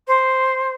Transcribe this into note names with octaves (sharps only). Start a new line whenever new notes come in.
C5